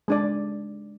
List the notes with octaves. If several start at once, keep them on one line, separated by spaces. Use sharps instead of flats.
G#3 D4 D5